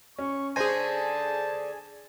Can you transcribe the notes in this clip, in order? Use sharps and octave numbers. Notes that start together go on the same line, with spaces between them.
C#4 C#6
D3 A3 D4 G#4 C5 G#5 A5 A#6